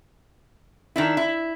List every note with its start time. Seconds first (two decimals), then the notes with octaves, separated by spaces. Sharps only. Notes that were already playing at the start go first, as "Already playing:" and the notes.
0.96 D#3 D4 E4
1.17 E4